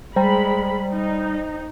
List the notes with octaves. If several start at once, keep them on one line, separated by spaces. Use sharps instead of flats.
G3 G#3 C5 G5 A#5 B5
D#4